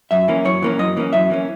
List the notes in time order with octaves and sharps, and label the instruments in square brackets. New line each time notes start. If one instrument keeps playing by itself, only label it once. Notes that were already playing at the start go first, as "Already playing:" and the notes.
[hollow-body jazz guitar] F#2 E5
E3 A#3 C#4
F#2 C#5
E3 A#3 C#4
F#2 D#5
E3 A#3 C#4
F#2 E5
E3 A#3 C#4